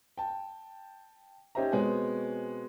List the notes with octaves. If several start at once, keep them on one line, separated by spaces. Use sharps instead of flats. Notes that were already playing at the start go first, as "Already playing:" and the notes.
G5 A5
C#4 D#4 G4 C5 E5 A#5
B2 G#3 B3 C4 C#5 G#5